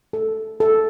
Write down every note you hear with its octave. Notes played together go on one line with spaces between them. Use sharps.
A4
A4